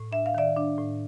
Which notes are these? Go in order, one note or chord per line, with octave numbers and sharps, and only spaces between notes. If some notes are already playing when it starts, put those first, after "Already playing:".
Already playing: A2
D4 E5
F5
D#3 D5 E5
D4
A2